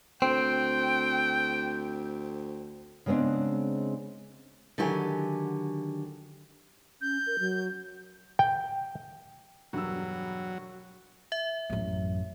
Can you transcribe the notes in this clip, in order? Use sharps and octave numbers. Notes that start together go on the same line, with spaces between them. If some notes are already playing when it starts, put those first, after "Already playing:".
D2 C4 G5
C#3 G#3 B3 C4 D4
D3 D#3 F#3 G4 D5 G#5
C#4 G6
A#4
F#3
G5
E1 G2 F#3 E6
E5
A1 F#2